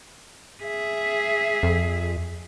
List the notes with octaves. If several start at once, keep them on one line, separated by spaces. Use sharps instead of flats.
G#4 E5
F2